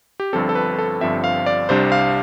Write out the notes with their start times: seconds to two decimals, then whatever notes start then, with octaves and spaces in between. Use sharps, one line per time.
0.20 G4
0.33 G1 G2 F3 C4 A4
0.49 A4
0.55 B4
0.79 A4
1.01 G1 G2 F3 C4 E5
1.24 F5
1.46 D5
1.69 C2 C3 G3 D4 C5
1.92 F5